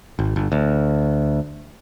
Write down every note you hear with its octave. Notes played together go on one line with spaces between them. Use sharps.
G#1
G1
D2